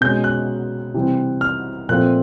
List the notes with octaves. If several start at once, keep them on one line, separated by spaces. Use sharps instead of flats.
B2 G#3 C#4 G6
F#6
C3 E3 G3 C4
F6
A#2 F3 A3 C4 F#6